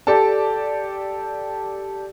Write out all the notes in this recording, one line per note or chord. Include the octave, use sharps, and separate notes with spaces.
G4 A4 D5 A5